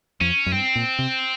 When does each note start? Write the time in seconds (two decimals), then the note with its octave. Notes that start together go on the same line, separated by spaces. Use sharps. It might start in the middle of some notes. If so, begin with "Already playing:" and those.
0.21 F2 C#4
0.46 F#2
0.52 G2 C4
0.75 A#2
0.99 C3